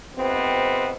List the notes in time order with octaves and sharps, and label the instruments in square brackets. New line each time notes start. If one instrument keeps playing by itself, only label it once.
[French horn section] F2 G#2 C3 B3 C4